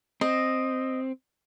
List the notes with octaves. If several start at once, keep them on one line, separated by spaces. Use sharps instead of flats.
C4 D#5